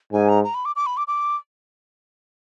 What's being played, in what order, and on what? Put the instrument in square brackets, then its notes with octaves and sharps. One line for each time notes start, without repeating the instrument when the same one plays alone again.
[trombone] G#2 [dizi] G#5
[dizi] A#5
A#5
B5
D6
D6
B5
D6
D6